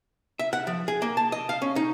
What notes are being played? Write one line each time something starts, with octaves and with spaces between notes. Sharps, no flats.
E5
F#5
F3
G#4
A#3
A5
D#5
F5
C#4
D#4